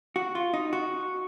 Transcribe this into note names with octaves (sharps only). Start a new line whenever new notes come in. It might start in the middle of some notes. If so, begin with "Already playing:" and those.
F#4
F4
D#4
F#4